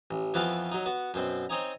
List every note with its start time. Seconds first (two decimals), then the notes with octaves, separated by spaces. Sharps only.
0.11 A1
0.34 F2 E3 B3 F4 B4 F5
0.71 F#3 D#4
0.86 B3 F#4
1.14 F#2 B2 C4 B5
1.49 C4 D#4 C#5 D#5 G#5 A#5